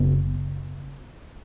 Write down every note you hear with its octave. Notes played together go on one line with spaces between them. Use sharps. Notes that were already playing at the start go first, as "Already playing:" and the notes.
Already playing: F#1 C#3 B3